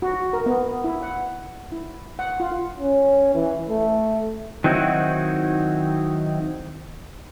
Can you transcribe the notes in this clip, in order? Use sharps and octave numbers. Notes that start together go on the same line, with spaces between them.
F#4
A#4
B3
E4
F#5
E4
F#5
F4
C#4
E3
A3
D#3 F#3 C4 D#4 E4 F#4